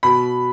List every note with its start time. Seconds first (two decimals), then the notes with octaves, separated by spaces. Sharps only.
0.03 B2 B5